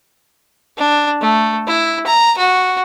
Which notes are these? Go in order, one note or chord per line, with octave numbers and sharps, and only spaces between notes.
D4
A3
E4
A#5
F#4